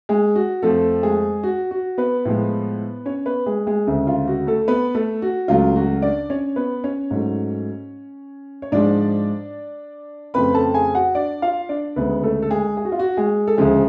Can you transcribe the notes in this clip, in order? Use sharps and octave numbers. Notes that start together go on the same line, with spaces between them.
G#3 G#4
F#4
F2 F3 A3 A4
G#3 G#4
F#4
F#4
B3 B4
A2 F3 G#3
C#4 C#5
B3 B4
G#3 G#4
G#3 G#4
D2 C#3 G#3
F4
F#4
A3 A4
B3 B4
A3 A4
F#4
C#2 C#3 F#3 A3 F4
F#4
D4 D5
C#4 C#5
B3 B4
C#4 C#5
G#2 F#3 A3
C#5
G#2 F3 G#3 D4 D5
F2 C#3 F3 A3 B4 B5
A4 A5
G#4 G#5
F#4 F#5
D4 D5
F4 F5
D4 D5
D2 C#3 G#3 B3 B4
A3 A4
A4
G#3 G#4
G#4
F#4
F4
F#4
G#3 G#4
A4
D2 C#3 F3 G#3 G#4